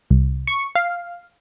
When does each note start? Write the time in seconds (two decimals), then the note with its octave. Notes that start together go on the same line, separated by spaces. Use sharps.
0.10 C2
0.47 C#6
0.75 F5